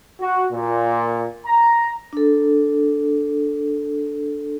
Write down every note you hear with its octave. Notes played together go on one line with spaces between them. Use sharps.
F#4
A#2
A#5
D4 A4